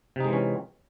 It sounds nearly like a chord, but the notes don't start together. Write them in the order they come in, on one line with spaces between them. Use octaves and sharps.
C3 D#4 G#3 E3 C#4